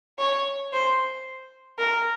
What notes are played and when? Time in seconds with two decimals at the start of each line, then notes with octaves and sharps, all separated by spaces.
0.19 C#5
0.73 C5
1.79 A#4